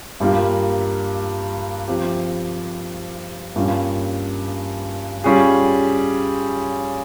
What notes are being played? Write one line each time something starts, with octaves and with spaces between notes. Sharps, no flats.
G2 G3 A#3 F4 A#4
F3 C4 G4
G2 G3 A#3 C#4 F4
G3 C#4 F4 G#4